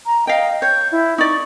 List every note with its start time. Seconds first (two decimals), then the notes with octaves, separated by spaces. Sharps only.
0.06 A#5
0.27 D#5 F5 G5
0.62 C#5 G6
0.92 E4
1.18 D#4 D5 C#6